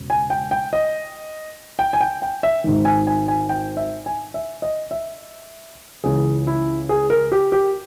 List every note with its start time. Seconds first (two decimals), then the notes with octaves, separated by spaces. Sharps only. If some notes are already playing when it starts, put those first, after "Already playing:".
Already playing: E1 C#3
0.10 G#5
0.30 G5
0.51 G5
0.73 D#5
1.79 G5
1.93 G#5
2.01 G5
2.22 G5
2.43 E5
2.64 G#1 G#2 D#3
2.85 G#5
3.07 G#5
3.28 G#5
3.49 G5
3.77 E5
4.06 G#5
4.34 E5
4.62 D#5
4.91 E5
6.04 C#2 C#3 E3 G#4
6.47 E4
6.89 G#4
7.10 A#4
7.32 G4
7.52 G4